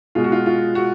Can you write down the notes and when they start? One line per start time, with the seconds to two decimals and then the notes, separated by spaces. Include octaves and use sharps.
0.15 B2 G#3 F4
0.24 F#4
0.32 F4
0.46 F4
0.75 F#4